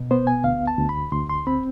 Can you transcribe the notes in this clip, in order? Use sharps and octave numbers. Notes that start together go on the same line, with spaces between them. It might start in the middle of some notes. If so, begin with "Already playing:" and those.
Already playing: B2
B3 C5
G#5
D2 F5
A5
D2
B5
D2 C6
C6
C4 B5